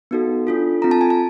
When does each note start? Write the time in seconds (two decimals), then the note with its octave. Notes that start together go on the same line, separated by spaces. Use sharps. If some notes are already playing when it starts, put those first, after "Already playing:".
0.11 B3 D#4 F#4 A4
0.47 D4 F4 A4
0.82 C4 F4 A4 A#5
0.91 A5
1.01 G#5
1.10 A5